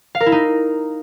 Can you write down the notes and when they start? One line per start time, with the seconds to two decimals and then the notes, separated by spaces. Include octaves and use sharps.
0.15 F5
0.21 A#4
0.26 E4
0.32 D#4